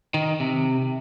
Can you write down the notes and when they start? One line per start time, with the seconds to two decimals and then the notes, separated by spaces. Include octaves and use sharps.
0.14 D#3
0.40 C3